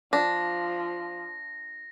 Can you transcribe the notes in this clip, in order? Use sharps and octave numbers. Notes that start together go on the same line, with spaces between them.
F3 D4 A#6